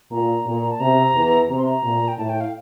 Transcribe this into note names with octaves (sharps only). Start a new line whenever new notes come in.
A#2 A#5
A#2
A5
C3 A#5
E2 E3
C3 A#5
C6
A#5
A#2
G5
A2 A5
G5
F5